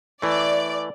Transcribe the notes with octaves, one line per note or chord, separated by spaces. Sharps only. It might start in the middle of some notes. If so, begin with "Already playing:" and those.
E3 A3 D5